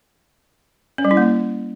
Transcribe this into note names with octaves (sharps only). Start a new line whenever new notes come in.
C#4
G3
E4
A#3